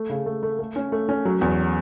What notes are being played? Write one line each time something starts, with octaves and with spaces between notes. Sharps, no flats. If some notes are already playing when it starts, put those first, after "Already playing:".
Already playing: A3
C#3
A3
A3
A3
C#4
A3
C#4
F#3
E2